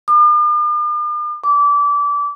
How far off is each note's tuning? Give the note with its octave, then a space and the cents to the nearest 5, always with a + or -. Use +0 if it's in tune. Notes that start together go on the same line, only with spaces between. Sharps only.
D6 +45
D6 -25